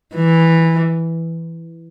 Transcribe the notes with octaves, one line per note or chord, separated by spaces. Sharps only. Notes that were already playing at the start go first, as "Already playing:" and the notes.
E3